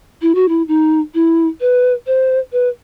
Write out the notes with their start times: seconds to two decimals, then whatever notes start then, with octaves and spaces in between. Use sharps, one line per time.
0.22 E4
0.35 F#4
0.48 E4
0.68 D#4
1.14 E4
1.61 B4
2.07 C5
2.52 B4